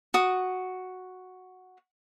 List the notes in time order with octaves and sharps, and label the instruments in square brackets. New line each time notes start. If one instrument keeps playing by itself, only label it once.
[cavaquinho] F#4 D#6